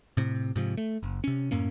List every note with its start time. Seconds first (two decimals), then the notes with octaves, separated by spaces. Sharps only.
0.17 A2 C3
0.56 G#2 C3 F3
0.77 A3
1.03 F#1
1.24 C3 C#4
1.51 F#2 A2 A#3 C#4